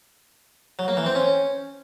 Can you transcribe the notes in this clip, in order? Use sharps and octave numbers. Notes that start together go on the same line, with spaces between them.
F#3
A#3
E3
C4
C#4